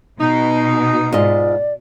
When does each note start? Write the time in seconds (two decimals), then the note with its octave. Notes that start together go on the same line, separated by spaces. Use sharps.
0.21 B2 D#4
1.12 G#2 F4 D5 D#5